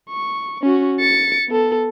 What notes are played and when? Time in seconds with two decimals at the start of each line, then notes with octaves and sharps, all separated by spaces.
0.10 C#6
0.62 C#4 F#4
1.00 A6 C#7
1.49 B3 A4